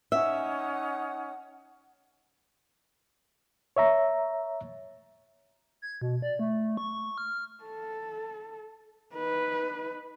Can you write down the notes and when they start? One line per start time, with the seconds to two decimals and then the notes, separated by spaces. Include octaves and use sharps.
0.12 C#4 D#4 E5 F#5
3.77 C#5 E5 A#5
5.82 G#6
6.02 B2
6.22 D5
6.39 A3
6.77 C#6
7.18 F6
7.64 A4
9.15 D#4 B4